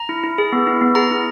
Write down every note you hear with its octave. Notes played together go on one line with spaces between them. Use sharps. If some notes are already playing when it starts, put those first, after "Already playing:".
Already playing: A#5
E4
E4
G#4
B3
E4
B3
G#4 A#5
E4